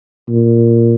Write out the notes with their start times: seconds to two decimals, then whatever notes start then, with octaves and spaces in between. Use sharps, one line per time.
0.29 A#2